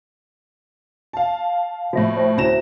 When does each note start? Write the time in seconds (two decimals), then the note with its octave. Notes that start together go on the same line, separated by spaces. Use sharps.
1.13 F5 A5
1.93 A2 F3 F#4 E5
2.17 C5 E5 G5
2.38 D2 C#4 E4 C5 A#6 E7